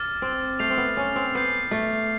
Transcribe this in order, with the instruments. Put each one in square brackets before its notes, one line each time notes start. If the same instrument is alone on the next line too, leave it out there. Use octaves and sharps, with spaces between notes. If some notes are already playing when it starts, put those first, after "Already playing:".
Already playing: [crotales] D6 F6 A6
[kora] C4
[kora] A3 [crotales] G6 C7 F7
[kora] C4
B3
C#4
C4
[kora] B3 [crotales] G6 C7 F7
[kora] A3